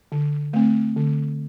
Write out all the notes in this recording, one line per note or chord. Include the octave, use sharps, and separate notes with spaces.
D3
A3 C4
D3